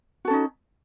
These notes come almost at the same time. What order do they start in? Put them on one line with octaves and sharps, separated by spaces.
F#4 A4 C#4 D#4